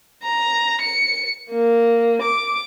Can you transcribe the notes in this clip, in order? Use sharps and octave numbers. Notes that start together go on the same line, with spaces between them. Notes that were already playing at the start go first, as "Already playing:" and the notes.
A#5
C#7
A#3
D6